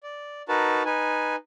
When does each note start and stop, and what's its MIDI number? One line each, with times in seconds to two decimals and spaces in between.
0.03 0.42 74
0.49 0.83 63
0.49 0.83 66
0.49 0.83 70
0.49 0.83 71
0.49 0.83 81
0.85 1.36 63
0.85 1.36 71
0.85 1.36 80